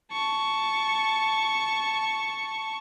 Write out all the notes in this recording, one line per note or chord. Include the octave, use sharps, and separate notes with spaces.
A5 C#6